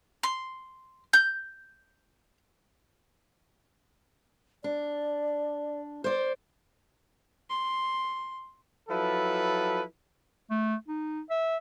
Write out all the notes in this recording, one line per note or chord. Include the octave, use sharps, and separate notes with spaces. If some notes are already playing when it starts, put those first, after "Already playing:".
C6
G6
D4 D5
C5 D5
C6
F3 F#3 E4 A4 B4
A3
D#4
E5